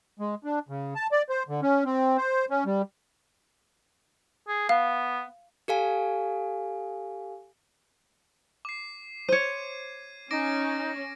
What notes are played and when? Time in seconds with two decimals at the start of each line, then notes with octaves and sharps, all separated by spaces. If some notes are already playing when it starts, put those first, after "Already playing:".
0.20 G#3
0.44 D4
0.69 C#3
0.95 A5
1.12 D5
1.29 C5
1.49 D3
1.62 C#4
1.85 C4
2.17 C5
2.50 C#4
2.66 G3
4.48 G#4
4.69 B3 F5
5.68 G4 A4 F5 G#5
8.65 D6 C7
9.29 C5 C#5 G#6 D#7
10.31 C#4 D#4 D6 A#6 D7